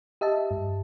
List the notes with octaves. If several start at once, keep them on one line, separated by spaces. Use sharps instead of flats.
G4 D#5 E5 A5
G2